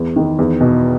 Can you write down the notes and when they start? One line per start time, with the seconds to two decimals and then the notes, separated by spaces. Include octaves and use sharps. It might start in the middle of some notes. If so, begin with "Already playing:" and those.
Already playing: E2
0.16 D#3
0.39 E2
0.60 B2